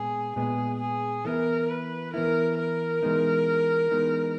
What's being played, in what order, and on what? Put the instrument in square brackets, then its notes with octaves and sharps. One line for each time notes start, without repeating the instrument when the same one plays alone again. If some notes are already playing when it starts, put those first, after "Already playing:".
Already playing: [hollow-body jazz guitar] A#2 G#3 B3 [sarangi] G#4
[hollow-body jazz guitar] A#2 G#3 B3 [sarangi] G#4
[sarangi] G#4
[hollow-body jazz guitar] E3 B3 E4 [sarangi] A#4
[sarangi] B4
[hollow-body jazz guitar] E3 B3 E4 [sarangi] A#4
[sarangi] A#4
[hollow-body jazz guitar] E3 G#3 B3 D#4
E3 G#3 B3 D#4